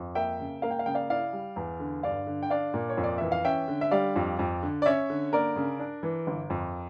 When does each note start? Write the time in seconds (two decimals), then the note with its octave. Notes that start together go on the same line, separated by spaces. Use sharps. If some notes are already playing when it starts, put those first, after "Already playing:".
Already playing: F2
0.15 A#3 E5 G5
0.40 C#3
0.62 A#3 F5
0.71 G5
0.79 F5
0.86 C#3 G5
0.94 D5 F5
1.10 E4 D5 F5
1.33 G3
1.56 E2
1.80 D3
2.03 G2 D5 F5
2.27 D3
2.43 G5
2.50 D4 D5 F5
2.74 A#2
2.89 C#5
2.97 F2
3.04 D5
3.18 E3 E5
3.32 F5
3.45 C#4 E5 G5
3.68 D3
3.81 E5
3.91 G3 D5 F5
4.16 F2
4.39 F2
4.63 D3
4.82 D5
4.86 C#4 C#5 E5
5.10 D3
5.33 A#3 A#4 D5
5.56 C#3
5.79 D4
6.03 E3
6.27 G1
6.50 F2